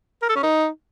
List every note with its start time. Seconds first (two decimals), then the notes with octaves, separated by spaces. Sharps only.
0.23 A#4
0.29 A4
0.36 C#4
0.43 D#4